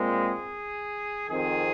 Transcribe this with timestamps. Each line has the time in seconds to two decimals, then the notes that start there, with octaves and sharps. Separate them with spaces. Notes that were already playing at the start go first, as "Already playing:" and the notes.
Already playing: A#2 G#3 C4
0.19 G#4
1.28 F2 D#3 C4 G#4